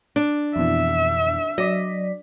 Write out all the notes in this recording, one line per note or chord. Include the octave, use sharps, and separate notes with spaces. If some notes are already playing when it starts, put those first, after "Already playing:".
D4
F2 B2 E3 E5
F#3 D5 D#5 B6